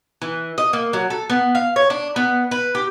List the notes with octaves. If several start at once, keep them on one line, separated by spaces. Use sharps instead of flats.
E3
D#5
A#3
F#3
A4
B3
F5
C#5
D4
B3
B4
G4